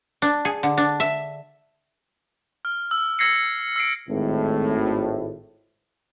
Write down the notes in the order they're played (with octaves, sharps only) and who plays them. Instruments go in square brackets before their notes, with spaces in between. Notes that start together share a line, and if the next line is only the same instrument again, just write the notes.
[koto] D4
G#4
D3
D4
E5
[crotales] F6
E6
E6 G#6 A#6 C7 C#7
E6 C7 D7
[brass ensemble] G#1 A2